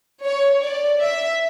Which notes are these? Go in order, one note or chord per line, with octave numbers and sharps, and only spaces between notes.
C#5
D5
E5